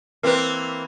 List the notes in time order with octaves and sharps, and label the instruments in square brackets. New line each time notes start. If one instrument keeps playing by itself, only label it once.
[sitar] E3 A#3 C4 [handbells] A#4 B4